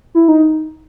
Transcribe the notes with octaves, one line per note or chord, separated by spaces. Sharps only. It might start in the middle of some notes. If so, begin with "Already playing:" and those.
E4
D#4